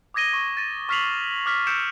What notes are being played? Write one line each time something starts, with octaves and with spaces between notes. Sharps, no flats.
D6 D#6 G#6 A#6 D#7 G7
C#6 A#6
A6 A#6 D#7
C#6 F6 B6 C7 F7 F#7
D6 F6 B6
E6 G6 B6 C#7 D7 E7